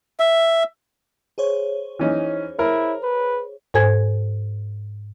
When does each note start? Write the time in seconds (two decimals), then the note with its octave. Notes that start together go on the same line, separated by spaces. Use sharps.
0.20 E5
1.38 G#4 C5 C#5
1.99 E3 C#4 D#4
2.59 E4 A#4
3.03 B4
3.74 G#2 A4 C5 G#5 G#6